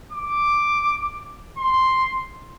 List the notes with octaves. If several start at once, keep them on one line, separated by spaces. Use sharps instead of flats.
D6
C6